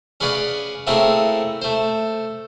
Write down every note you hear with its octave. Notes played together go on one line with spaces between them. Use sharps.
C#4 G#4 B4 C#5 D5 F5
A3 A#3 C4 E4 G#4 C#5
A3 C5